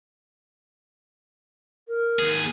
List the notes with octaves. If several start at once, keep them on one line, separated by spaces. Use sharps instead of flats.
A#4
D#2 G#4